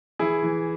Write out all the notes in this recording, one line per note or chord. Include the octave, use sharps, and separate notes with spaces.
E3 E4 G#4
E3